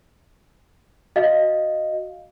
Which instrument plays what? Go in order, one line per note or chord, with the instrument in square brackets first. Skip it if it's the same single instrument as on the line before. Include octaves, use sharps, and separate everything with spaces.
[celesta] F#4 D#5 F5